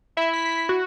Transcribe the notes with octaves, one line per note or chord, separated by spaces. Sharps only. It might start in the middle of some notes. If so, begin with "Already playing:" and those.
E4 E5
B6
F#4